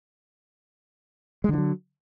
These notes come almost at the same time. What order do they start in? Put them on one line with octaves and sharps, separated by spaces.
G#3 D3 E3 F#3